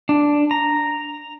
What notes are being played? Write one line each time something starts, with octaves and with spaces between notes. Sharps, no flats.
D4
A#5